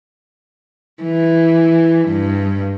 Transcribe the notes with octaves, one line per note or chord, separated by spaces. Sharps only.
E3
G2